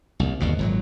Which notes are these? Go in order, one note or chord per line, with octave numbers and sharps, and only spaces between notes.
C2 A#2
G1 D#2 B2
G#1 A#2 F#3